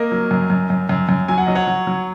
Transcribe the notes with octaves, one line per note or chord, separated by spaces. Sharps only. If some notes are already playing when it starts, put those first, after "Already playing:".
Already playing: A#3 A#4 D#5
F#3
F#2
F#2
F#2
F#2
F#2
F#3 G#5
F#5
F#3 D#5
C#5 F#5
F#3
F#3